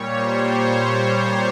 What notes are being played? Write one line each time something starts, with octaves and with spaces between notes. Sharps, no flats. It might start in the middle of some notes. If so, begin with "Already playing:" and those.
Already playing: A#2 G3 C#5
C5
C5
C#5